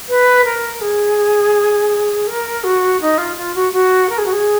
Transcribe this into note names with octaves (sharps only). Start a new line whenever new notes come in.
B4
A#4
G#4
A#4
F#4
D#4
F4
F4
F#4
F#4
A#4
G#4
F#4
G#4